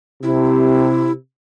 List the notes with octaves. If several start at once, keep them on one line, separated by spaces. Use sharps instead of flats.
C3 E4